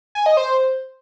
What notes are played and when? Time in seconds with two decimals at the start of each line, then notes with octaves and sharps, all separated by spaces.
0.15 G#5
0.26 D#5
0.37 C5